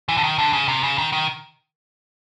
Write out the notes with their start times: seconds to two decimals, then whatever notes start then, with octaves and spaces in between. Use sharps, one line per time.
0.09 E3
0.17 D3
0.24 D#3
0.38 D3
0.53 C#3
0.68 C3
0.83 C#3
0.98 D#3
1.13 D#3